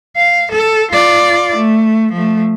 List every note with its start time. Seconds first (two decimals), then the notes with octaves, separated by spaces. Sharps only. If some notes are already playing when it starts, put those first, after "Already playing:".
0.16 F5
0.52 A4
0.92 F4 D5
1.56 A3
2.13 F3 A3